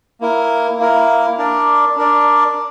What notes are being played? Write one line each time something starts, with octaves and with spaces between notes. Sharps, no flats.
A#3 E4 A#4
A#3 E4 A#4
D4 A#4 D5
D4 A#4 D5